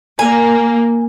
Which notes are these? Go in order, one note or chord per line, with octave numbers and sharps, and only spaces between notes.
A#3 G#5